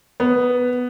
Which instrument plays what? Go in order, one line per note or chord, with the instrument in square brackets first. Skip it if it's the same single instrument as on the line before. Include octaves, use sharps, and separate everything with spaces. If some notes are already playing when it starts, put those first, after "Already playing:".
[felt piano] B3